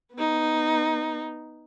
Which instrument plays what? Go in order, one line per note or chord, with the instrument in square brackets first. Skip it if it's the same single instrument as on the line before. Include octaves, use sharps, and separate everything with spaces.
[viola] B3 D#4